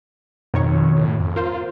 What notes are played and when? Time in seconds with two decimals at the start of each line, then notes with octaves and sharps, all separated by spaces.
0.54 F2 B2 D#3 C#5
0.97 A2
1.19 F2
1.36 F4 A#4 C5